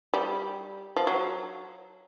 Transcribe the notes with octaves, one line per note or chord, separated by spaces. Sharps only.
G3
F3
F#3